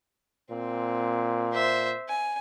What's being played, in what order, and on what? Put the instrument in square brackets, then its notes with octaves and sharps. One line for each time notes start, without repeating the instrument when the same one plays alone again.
[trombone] A#2 [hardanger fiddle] C4
[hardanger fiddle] C5 E5
G#5